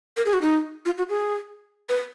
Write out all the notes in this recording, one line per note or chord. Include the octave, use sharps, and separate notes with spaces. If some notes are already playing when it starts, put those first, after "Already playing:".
A#4
G#4
F#4
D#4
F4
F#4
G#4
B4